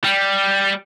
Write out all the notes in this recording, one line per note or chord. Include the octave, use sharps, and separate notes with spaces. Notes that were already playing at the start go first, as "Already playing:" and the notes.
G3